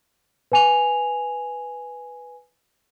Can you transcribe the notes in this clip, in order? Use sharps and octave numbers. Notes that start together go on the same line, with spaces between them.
B4 G#5 F7